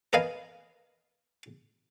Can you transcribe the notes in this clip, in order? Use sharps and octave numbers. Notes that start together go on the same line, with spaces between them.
A#4 B4 D#5 F5 G#5